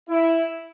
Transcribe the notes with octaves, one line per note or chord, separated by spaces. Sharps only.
E4